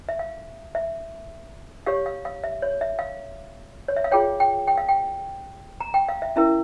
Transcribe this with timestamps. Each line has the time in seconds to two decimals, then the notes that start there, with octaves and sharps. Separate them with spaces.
0.09 E5
0.19 F5
0.75 E5
1.86 G4 C#5 F5
2.06 F5
2.25 F5
2.44 E5
2.62 C#5
2.81 E5
2.99 F5
3.88 C#5
3.96 E5
4.04 F5
4.11 F4 G#4 C#5 G5
4.40 G5
4.67 G5
4.78 F5
4.88 G5
5.80 A#5
5.94 G5
6.09 F5
6.22 E5
6.36 C#4 E4 A#4 E5